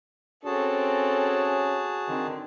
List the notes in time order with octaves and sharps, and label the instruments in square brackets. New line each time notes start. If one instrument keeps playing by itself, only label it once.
[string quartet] C4 A4 [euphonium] C#4 [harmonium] F#4 G#4 A5
[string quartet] D3 C4 [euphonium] D#3